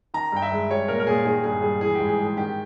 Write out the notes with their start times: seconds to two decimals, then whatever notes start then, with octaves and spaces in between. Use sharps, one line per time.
0.14 D#3 A#5
0.32 G2 G5
0.42 E5
0.52 G#3
0.71 G3 C#5
0.88 A#2 A#4
1.00 A#4
1.07 A#2 G#4
1.25 D#3 G#4
1.44 G2 G#4
1.62 G3 G#4
1.81 E3 G#4
1.95 G#2 G4
2.09 G#4
2.18 G#3
2.23 G#4
2.37 D#3 G4